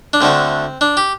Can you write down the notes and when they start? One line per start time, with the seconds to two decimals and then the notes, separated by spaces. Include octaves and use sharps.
0.13 D4
0.21 D2 D3 A3 C4
0.81 D4
0.97 G4